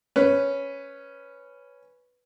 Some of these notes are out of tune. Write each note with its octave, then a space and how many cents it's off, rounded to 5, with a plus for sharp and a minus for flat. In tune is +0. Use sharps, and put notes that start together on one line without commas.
C#4 +0 B4 +0